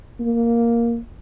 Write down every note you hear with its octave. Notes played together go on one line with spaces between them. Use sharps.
A#3